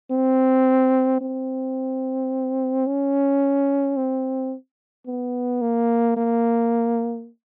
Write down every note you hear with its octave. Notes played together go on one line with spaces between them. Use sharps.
C4
C4
C#4
C4
B3
A#3
A#3